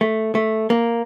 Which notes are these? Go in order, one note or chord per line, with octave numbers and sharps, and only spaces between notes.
A3
A3
A#3